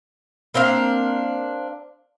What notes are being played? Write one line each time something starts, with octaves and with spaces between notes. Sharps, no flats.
A#3 C4 D4 F5